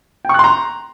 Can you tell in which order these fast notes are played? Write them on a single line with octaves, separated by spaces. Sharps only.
G5 C#6 F#6 C6 A#5